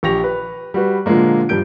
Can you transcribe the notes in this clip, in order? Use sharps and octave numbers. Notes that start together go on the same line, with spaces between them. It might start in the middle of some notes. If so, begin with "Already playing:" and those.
A#1 G4 C#6 A#6 F7
B4
G3 F#4 B4
A#2 D3 F3 G#3 A#3
G2 F3 G3 G6 D7